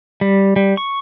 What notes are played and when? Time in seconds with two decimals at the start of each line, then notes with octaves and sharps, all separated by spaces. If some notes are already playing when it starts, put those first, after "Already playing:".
0.21 G3
0.56 G3
0.77 C#6